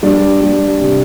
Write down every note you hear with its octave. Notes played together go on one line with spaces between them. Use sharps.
G3 D4
G3
C3